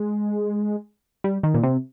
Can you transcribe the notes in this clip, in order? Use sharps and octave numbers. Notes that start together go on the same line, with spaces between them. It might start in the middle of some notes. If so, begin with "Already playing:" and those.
Already playing: G#3
G3
D#3
A#2
C3